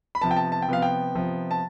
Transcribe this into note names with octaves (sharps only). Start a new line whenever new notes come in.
B5
C3 F3 B3 A5
G5
A5
A5
G5
C3 F3 B3 F5
G5
C3 F3 B3
A5